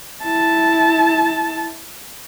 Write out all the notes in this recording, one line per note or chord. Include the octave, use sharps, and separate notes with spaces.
E4 A5